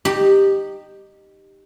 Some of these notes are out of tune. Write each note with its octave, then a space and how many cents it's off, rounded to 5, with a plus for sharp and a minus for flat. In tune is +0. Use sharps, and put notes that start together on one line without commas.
D#4 -20 G4 +0